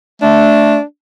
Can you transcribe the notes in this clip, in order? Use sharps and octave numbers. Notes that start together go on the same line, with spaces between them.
A3 D4